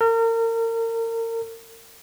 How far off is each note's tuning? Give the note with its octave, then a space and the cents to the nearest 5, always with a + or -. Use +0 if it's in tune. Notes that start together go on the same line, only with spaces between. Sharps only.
A#4 -35